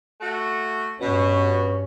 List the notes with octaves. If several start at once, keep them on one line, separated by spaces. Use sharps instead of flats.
A3 F#4
G2 B2 C#4